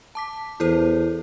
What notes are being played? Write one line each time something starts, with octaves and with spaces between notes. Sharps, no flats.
A5 D6 B6
E2 E4 A4 C5